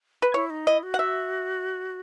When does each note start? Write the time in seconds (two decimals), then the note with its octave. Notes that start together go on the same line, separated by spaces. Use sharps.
0.22 B4
0.34 E4 C#5
0.50 D#4
0.67 E4 D#5
0.83 F#4
0.94 F#5
0.99 E5